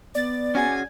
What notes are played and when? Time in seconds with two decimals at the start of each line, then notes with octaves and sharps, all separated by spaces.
0.15 B3 D5 A6
0.55 C#4 F#4 G#4 G#5